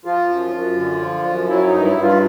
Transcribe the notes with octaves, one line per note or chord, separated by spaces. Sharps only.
F3 F4
F#2
F#2
D3
F3
F#2
F#3 E4
D#4
G2
E4
G2
F4